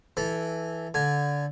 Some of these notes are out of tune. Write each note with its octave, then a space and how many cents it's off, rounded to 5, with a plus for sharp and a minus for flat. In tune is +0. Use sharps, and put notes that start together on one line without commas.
E3 +0 A4 -15 B5 +0
D3 -20 G#5 +0